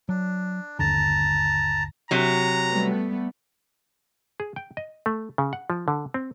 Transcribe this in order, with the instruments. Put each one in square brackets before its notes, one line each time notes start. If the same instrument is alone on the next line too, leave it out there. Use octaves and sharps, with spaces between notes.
[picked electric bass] F#3 [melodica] D4
[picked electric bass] G1 D#2 D3 [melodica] A5 A#5
[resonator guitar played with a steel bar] C3 F#3 [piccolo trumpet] A#5
[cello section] G3 A3 B3
[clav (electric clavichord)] G#4
G5
D#5
A3
C#3
F#5
F3
D3
C4